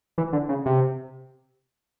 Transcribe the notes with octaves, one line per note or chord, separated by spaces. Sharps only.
E3
D3
C#3
C3